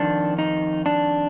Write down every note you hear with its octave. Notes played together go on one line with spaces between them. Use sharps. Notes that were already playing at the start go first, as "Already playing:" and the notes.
Already playing: F2 D#3 D4
D#4
D4